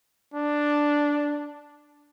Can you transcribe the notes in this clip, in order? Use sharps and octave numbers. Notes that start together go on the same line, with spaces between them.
D4